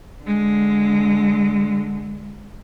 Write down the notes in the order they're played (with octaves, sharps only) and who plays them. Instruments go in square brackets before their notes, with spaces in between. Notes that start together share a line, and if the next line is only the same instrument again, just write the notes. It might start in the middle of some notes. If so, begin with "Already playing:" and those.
[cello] D3 G#3